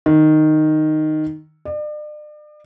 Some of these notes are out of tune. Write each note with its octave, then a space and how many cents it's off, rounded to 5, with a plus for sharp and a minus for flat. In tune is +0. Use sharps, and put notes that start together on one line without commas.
D#3 -10
D5 +40